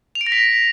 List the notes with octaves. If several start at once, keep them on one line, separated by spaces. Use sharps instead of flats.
F7
D7
A#6
B6